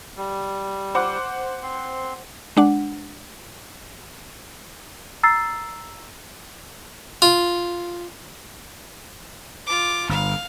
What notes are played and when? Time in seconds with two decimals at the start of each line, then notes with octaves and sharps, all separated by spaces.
0.17 G3
0.95 C5 F#5 D6
1.63 C4 C6
2.57 G#3 D4 F#5
5.23 A#5 E6 A6 C7
7.22 F4
9.66 F4 D6
10.09 G1 F5